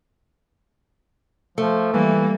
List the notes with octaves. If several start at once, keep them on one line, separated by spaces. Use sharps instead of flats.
F3 A3
E3 G3 A#3